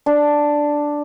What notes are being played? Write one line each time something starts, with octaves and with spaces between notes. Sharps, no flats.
D4